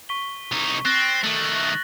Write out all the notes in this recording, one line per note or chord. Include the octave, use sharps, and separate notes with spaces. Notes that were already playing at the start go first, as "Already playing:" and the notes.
C#6 B6 G7
C2 D#4
C4 F#6 A6 A#6
D#3 A3 F#7